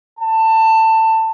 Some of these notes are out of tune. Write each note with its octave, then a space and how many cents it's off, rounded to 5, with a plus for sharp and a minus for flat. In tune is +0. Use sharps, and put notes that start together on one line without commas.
A5 +20